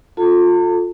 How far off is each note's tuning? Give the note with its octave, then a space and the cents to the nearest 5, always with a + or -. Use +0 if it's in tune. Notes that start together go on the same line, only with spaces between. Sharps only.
F4 +25 A4 +0 A5 +45